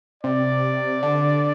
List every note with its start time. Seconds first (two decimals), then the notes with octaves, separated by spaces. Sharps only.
0.23 C3 D5
1.03 D3